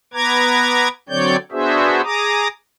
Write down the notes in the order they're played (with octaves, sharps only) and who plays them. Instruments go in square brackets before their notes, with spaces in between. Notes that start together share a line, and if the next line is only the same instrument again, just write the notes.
[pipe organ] B3 B4 A#5 D6 G#6
D3 F#3 C4 C#5 D5 G6
B3 D4 F#4 G#4 C5 E5
G#4 A#5 D6 D#6